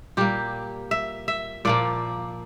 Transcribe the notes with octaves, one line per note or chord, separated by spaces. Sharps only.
A#2 G3 A#3 G4
E5
E5
A#2 F3 A#3 D5